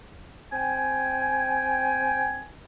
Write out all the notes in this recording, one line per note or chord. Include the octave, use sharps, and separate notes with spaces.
C4 G5 G#5